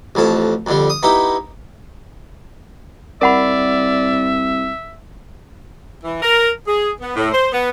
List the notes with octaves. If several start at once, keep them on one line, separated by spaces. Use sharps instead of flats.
A1 F2 F3 A5
F2 D3 G3
D#6
B3 D#4 E4 G4
C2 A#4 D5 E5 F#5 B5
E3
A#4
G#4
B3
A2
C5
B3